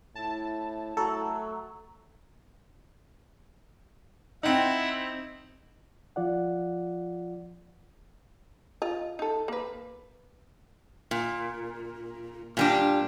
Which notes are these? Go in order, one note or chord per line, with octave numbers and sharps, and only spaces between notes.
A2 E4 A5
F#3 A3 A4
C4 D#4 E4 F#5
F3 F4 D5 F#5
F4 D#5
D#4 A4
A#3 B4
A#2
A#2 G3 D4